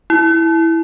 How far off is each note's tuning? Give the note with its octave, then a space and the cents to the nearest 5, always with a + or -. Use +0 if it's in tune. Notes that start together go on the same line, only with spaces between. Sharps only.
E4 -5